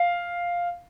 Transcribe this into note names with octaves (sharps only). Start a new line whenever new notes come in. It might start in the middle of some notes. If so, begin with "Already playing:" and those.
Already playing: F5